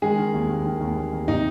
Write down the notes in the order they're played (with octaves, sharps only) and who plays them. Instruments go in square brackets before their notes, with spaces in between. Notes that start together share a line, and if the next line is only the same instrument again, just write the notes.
[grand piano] D#3 G#3 G#4
D#3
D#2
D#2
D#3
D#2
D#2
D#2
C3 D#4